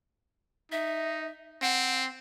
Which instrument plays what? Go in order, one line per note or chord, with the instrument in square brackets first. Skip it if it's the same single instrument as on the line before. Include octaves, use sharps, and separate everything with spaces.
[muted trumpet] D#4 [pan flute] E5
[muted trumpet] C4 [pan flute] F#5